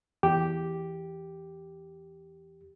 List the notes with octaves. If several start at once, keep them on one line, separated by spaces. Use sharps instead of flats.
E2 G4